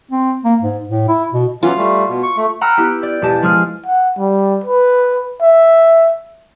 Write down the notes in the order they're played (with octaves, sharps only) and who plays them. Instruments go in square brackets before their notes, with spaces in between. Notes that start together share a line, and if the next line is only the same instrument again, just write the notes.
[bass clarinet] C4
A#3
G#2
A2
E4
B2
[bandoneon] E3 F#3 C#4 [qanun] F4
[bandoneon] G3 A3
B2
C#6
A3
[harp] F#5 G5 A#5 B5 E6 F6
B3 E4 G4
D5 G6
E1 G4 D#5 A5
F3 G#3 G#4 F6 C7
[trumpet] F#5
G3
B4
E5